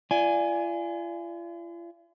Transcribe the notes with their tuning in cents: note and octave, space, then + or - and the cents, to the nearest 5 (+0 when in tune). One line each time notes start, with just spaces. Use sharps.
F4 -45 D5 +0 G#5 +0